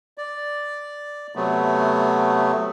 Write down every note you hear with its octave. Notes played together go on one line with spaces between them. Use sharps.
D5
C3 F#3 A3 B3